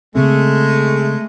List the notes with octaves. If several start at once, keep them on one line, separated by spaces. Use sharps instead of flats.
C#3 G#3 A3 C4